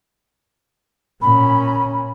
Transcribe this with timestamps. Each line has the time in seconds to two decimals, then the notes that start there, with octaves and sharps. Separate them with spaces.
1.22 A#2 C#4 B5